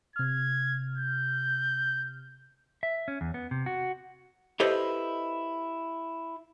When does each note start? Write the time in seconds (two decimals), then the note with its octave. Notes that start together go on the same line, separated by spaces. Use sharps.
0.16 C3 F6 G#6
0.98 G6
2.83 E5
3.08 C#4
3.21 E2
3.34 B3
3.51 C3
3.66 F#4
4.60 E4 G4 A4 B4 C5 D#5